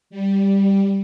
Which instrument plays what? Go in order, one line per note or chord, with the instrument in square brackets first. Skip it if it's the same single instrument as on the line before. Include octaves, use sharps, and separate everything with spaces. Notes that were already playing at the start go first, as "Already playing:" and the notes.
[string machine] G3